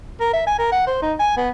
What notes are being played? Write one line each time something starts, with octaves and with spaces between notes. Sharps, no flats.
A#4
E5
G#5
A#4
F#5
C5
D#4
G#5
B3